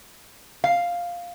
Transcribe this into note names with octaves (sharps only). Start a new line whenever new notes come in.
F5